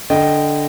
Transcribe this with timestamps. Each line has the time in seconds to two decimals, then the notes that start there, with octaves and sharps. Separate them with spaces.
0.10 D3 D#5 G5